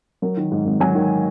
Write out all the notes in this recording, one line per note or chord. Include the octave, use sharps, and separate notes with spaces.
F#3 A#4
D#3
G#2
G#1
F#3 G#5
D#3